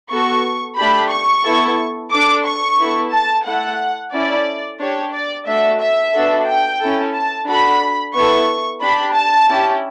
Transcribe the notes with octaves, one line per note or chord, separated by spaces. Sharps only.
B3 F#4 A4 C#6
A3 D4 G4 B5
C#6
B3 E4 A4
D4 A4 D6
C#6
B3 E4 A4
A5
A3 E4 A4 F#5
C#4 E4 A4 D5
D4 G4 C#5
D5
A3 D4 F#4 A4 E5
E5
B3 D4 F#4 A4
G5
C#4 E4 A4
A5
D4 F#4 A4 B5
B3 E4 A4 C#6
D4 G4 B5
A5
C#4 E4 G4